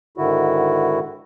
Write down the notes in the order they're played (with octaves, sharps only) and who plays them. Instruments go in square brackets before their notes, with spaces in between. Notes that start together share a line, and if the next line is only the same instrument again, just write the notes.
[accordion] G#2 D3 D#3 E4 F#4